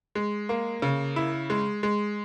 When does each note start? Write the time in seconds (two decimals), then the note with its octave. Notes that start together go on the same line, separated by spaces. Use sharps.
0.15 G#3
0.49 A#3
0.82 C#3
1.16 E4
1.50 G#3
1.83 G#3